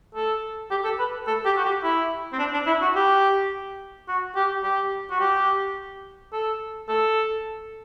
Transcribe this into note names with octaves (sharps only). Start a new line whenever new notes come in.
A4
G4
A4
B4
A4
G4
F#4
G4
E4
C4
D4
D4
E4
F#4
G4
F#4
G4
G4
F#4
G4
A4
A4